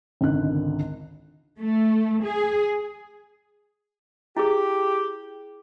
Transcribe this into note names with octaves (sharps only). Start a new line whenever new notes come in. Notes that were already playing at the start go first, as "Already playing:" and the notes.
G#1 C#2 D3 D#3 F#6
A3
G#4
E4 G4 G#4